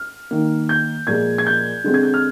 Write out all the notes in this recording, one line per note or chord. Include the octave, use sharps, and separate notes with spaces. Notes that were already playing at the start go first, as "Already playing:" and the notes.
Already playing: F6
D#3 A#3
G6
A#2 F3 G#3 G#6
G#6
G6
D3 G#3 C4
G#6
G6
F6